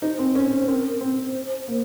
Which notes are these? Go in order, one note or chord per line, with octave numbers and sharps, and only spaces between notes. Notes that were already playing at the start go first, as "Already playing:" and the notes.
D#4 C5
C4
C#4 C5
C4 A#4
C4 C5
A#3